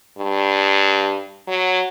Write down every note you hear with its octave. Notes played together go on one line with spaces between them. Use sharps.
G2
F#3